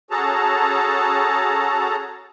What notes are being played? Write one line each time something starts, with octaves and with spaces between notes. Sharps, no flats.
C#4 F#4 G#4 A4 A5 A#5